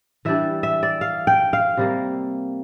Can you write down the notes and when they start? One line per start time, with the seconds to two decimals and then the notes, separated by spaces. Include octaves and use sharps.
0.25 E3 G3 D4 E5
0.63 E5
0.83 D5
1.01 F5
1.27 G5
1.53 F5
1.77 C3 G3 A#3